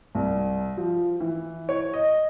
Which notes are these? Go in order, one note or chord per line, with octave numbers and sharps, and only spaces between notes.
C2
F3
E3
C#5
D#5